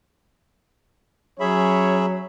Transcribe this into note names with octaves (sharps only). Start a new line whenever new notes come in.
F#3 C#4 G#4 C#5 E5 B5